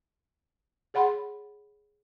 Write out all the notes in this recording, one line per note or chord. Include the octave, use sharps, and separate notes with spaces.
G#4 C#5 F#5 B5 C6